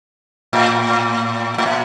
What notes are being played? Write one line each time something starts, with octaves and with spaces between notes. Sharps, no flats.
A2
A2
A#2